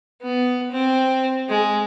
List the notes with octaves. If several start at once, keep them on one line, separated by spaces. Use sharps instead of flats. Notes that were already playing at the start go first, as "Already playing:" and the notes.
B3
C4
G#3